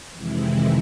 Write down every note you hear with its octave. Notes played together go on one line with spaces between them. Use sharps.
F2 C3 D#3 E3 G#3 E4